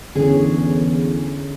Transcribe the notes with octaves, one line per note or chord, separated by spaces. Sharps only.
E2 D3 C#4 G#4